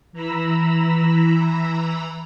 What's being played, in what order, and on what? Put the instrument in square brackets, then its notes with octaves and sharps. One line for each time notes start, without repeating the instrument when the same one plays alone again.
[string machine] E3 A#5 B5 E6